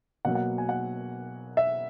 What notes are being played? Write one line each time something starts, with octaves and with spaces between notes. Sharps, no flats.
B2 F#3 A#3 F#5
F#5
G#5
F#5
E5